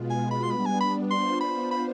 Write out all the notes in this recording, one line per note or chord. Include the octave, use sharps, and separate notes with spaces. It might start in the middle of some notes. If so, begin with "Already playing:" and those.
Already playing: B2 G#3 B3 F4
G#5
B5
C6
G3 B3 D4 B5
G#5
B5
B3 D4 F4 C5 C6
B5
B5